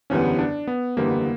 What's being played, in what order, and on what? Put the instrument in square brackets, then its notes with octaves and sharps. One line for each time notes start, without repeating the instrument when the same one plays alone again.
[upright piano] F#1 E2 D3 G3 B3 [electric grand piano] C#4
[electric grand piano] D4
B3
[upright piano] F#1 E2 D3 G3 B3 [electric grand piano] A#3